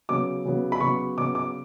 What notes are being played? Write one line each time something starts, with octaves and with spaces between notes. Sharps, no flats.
C#3 F#3 B3 D6
C#3 F#3 B3
B5
C#3 F#3 B3 C#6
C#3 F#3 B3 D6
D6